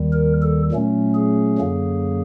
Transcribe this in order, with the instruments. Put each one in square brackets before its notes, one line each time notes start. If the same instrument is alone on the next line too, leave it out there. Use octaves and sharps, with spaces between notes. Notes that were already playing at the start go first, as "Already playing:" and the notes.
Already playing: [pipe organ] D#2 D#3 G3
A#4
A4
A#2 F#3 A3 C#4
G#4
F#2 D3 F#3 A#3